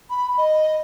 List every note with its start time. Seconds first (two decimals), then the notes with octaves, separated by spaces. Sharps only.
0.10 B5
0.38 D#5